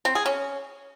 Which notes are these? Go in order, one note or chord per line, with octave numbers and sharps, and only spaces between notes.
C4
G#4
C#4